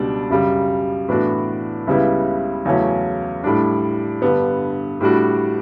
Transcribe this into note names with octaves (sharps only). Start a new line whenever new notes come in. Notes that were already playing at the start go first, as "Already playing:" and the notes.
Already playing: C#2 B2 G3 D4
F#2 C#3 G3
A2 E3 B3 D4 F#4
C#2 C#3 G3 B3 E4
E2 C#3 F#3 A3 C#4
A2 G3 D4
G2 D3 G3 B3
A2 G3 D4 F#4